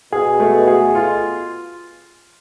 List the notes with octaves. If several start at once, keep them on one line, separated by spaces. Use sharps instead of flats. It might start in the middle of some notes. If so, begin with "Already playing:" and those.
B2 G#4
A3
G#4
F4